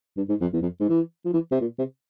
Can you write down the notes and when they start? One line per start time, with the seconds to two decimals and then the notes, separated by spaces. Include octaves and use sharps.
0.17 G2
0.29 G#2
0.41 F2
0.53 E2
0.62 F2
0.80 G#2
0.89 E3
1.25 F3
1.33 E3
1.51 C3
1.61 A#2
1.78 C3